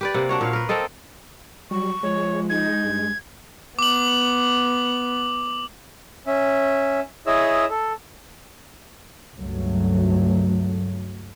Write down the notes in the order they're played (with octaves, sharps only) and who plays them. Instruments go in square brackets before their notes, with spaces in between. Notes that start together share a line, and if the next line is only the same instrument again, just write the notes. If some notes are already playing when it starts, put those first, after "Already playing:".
[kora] G4 B4 D5
C3 A#3 F#5
D4 F#4 C#5
A#2 C#5 F5
A#4 B4
A#3 C4 A4 D#5
[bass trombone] F#3 [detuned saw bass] G3 [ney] C#6
[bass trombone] F3 [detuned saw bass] G#3 [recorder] C#5
[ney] D#4 [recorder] G#6
[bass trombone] G2
[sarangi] B3 [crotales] D6 F#7
[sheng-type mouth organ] C#4 E5
E4 G#4 C#5 D#5 E5 E6
A4
[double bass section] C#2 G2 F#3 A3